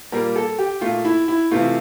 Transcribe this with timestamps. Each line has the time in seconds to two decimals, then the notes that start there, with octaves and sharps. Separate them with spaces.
0.12 A#2 G3 A#3 A#4
0.36 A4
0.58 G4
0.81 A#2 A3 F4
1.05 E4
1.28 E4
1.51 C3 E3 A3 F4